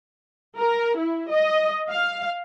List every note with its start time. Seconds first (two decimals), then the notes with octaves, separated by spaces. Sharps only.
0.57 A#4
0.97 E4
1.30 D#5
1.90 F5